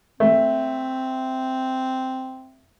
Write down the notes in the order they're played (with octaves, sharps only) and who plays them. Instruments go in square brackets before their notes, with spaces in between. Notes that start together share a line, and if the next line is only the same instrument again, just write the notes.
[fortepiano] A3 [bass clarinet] C4